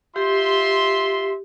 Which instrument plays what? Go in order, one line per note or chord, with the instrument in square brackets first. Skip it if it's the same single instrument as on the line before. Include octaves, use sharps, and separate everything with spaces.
[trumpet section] F4 E5 C6 [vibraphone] G4